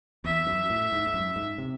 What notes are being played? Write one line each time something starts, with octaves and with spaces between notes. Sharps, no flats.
E2 E5
F#2
A2
G#2
G#2
F#2
G#2
C3